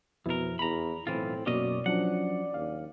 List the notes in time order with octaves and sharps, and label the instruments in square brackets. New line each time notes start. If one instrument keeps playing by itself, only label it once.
[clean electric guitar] F2 A#4 [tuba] B2 [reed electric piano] E4
[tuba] E2 [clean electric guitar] A#5 B5
[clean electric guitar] B1 E3 F4 [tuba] A2 [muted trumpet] C4
[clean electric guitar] F#2 C#4 D#5 [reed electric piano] B2 A#3 D6 [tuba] F#3 [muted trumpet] D5
[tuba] F3 [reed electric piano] F#3 C#4 D4 [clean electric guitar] F#5
[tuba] D#2 [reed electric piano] F5